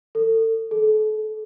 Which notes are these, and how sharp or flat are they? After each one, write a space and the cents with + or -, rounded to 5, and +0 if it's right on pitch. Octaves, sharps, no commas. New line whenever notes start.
A4 +35
A4 -35